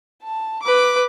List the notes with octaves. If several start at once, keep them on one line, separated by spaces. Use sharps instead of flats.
A5
B4 D6